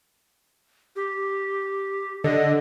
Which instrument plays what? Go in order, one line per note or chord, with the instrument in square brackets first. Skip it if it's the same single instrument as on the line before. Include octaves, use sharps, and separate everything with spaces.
[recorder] G4
[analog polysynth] D3 [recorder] D#5